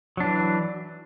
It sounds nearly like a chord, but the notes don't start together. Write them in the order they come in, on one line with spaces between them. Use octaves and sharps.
F#3 D4 E3